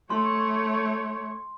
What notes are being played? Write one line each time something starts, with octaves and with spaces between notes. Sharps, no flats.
A3 C#5 C6